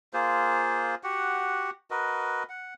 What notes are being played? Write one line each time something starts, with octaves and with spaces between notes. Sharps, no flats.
A#3 F4 G#4 C5
F#4 G4 F#5
F#4 A#4 B4 D#5
F#5